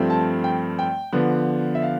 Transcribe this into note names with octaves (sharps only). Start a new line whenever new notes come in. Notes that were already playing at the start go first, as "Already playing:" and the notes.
Already playing: G2 F3 A3 C4
A5
G5
G5
D3 F3 B3
E5
F5